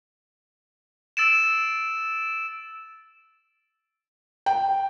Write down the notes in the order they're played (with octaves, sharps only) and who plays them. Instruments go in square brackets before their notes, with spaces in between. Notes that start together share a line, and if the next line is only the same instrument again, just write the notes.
[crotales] E6 A6 D7 E7
[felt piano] G5